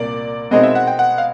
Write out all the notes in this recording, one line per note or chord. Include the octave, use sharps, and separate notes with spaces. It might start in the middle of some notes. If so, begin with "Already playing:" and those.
Already playing: C2 A#2 A#3 D5
B2 G#3 C4 D#4 D#5
E5
F#5
G5
F#5
F5